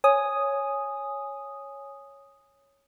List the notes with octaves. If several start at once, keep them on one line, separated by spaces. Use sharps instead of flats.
C#5 G#5 D#6